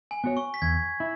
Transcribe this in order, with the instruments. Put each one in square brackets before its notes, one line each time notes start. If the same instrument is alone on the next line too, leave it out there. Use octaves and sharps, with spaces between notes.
[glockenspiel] G#5
[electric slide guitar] B3 F#4 C#5
[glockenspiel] C#6
B6
[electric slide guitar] E2 [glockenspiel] G#6
[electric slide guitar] E4